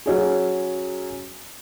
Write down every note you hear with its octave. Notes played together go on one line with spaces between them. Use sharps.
F#3 C#4 G#4